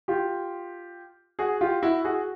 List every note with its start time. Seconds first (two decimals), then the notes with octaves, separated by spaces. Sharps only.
0.08 F4 G4
1.39 F#4 G#4
1.61 F4 G4
1.83 E4 F#4
2.04 F#4 G#4